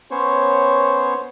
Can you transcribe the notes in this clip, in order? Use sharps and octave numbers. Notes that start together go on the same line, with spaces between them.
B3 C#4 C5 C#5